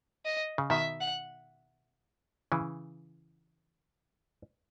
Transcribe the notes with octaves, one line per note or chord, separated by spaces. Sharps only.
D#5
C#3
B2 D#3 E5
F#5
C#3 E3